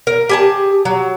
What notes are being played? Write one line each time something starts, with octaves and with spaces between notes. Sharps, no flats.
A#4
G4 G#4 A5
F#3